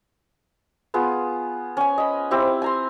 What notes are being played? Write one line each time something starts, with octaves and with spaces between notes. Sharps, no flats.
B3 F4 G#4
C#4 G#5
D#5 B5
C4 E4 G4
G#5 A#5 C6